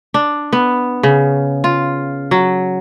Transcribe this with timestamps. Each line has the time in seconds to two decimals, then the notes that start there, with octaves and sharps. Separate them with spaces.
0.14 D4
0.53 B3
1.03 C#3
1.64 F4
2.31 F#3